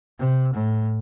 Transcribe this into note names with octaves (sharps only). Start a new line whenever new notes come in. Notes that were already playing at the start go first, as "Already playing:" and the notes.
C3
A2